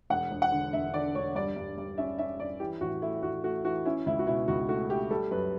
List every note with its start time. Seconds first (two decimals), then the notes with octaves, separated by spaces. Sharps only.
0.10 E1 F#5
0.31 E1
0.42 F#5
0.52 D3
0.73 E1 E5
0.93 D3 D5
1.15 E1 C#5
1.35 G2 D5
1.57 G2
1.78 G2
1.98 C#4 E5
2.18 C#4 E5
2.39 G2 D5
2.60 E3 G4
2.81 A1 F#4
3.02 A3 E4
3.22 A1 F#4
3.44 A3 F#4
3.65 E3 F#4
3.85 C#4 E4
4.06 C#2 E4
4.19 F#4
4.27 B2 E4
4.48 C#2 F#4
4.69 A3 F#4
4.89 A3 G4
5.11 G3 A4
5.31 F#2 B4